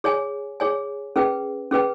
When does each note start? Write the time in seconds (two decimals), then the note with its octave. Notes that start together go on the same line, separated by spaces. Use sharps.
0.04 G#4 C#5 G#5
0.60 G#4 C#5 G#5
1.16 C#4 G#4 B4 G5
1.71 C#4 G#4 B4 G5